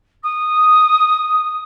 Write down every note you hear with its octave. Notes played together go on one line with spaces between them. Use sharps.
D#6